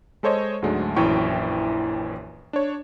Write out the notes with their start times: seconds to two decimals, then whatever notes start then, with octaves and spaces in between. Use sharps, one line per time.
0.23 G#3 A4 C5 C#5 D#5
0.62 D2 G#2 F#3 G#3 A3 D4
0.96 A#1 F#2 E3 E4 G5 C#6
2.53 D4 C#5